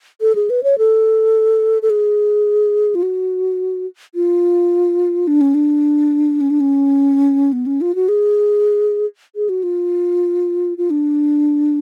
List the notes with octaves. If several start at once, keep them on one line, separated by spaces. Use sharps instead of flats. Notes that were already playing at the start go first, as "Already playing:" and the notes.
A4
G#4
B4
C#5
A4
A4
G#4
F4
F#4
F4
D4
C#4
D4
C#4
D4
C#4
B3
C#4
F4
F#4
G#4
G#4
F#4
F4
F4
D4